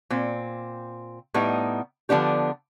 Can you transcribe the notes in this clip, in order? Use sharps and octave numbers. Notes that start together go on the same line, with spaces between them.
A#2 C4
A2 G3 B3 D#4
D3 F3 B3 D4 G4